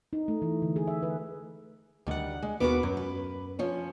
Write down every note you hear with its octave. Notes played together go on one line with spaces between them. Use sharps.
D#4
A3
E3
D3
G#4
E5
B4
D2 D#3 G3 F#5
G#3
D#2 B3 F#4 A#4 B4 D6
F#2 F#3
B4
F3 C#4 C#5